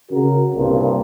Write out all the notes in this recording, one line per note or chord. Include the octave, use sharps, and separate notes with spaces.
C#3 F#4 A#4
C2 G2 A#2